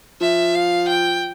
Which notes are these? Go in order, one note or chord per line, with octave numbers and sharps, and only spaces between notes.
F3 E5
F5
G5